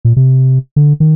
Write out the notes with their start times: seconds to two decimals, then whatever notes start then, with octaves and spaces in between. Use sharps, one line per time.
0.05 A#2
0.16 C3
0.76 D3
1.00 D#3